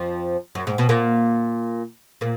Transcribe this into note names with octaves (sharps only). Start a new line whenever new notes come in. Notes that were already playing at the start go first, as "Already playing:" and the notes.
Already playing: F2 F3
F#2
G#2
B2
A#2 A#3
A#2 A#3